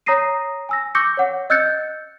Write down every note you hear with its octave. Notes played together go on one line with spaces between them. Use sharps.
C#5 A#5 D#6 A#6 C7 D#7
G#5 E6 A#6
C#6 D6 E6 G6 A#6 C#7
C#5 F#5
D#5 E6 F#6 G6 A6 C#7